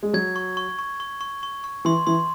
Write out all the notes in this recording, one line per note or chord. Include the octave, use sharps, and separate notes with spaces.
G#3
F#3 G#6
C#6
C#6
C#6
C#6
C#6
C#6
C#6
E3 C6
E3 C6